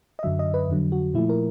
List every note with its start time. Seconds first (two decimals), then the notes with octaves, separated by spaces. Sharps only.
0.19 D#5
0.23 F#2 D3 F#3 E5
0.39 D#5
0.54 B4
0.69 F2 D3 F#3
0.92 F#4
1.14 A#2 F3 A3 E4
1.29 A#4